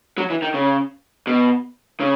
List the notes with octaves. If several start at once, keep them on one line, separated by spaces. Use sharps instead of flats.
F#3
E3
D#3
C#3
B2
C#3